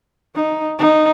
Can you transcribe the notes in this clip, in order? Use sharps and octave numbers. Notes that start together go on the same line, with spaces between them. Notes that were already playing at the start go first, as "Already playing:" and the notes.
D#4
D#4